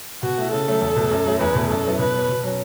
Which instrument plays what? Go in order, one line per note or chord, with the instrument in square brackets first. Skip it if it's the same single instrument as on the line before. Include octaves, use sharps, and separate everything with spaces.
[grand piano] B2 [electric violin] F#4
[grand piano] A3 E4
[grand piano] C#3 [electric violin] A4
[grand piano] F#3 A3 C#4
E2
B2 A3
F#2
F#3 A3
[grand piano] E2 [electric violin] B4
[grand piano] B2 A3
[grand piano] F#2 [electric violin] A4
[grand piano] F#3 B3 E4
[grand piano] B2 [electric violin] B4
[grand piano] F#3 B3
B2
F#3 C#4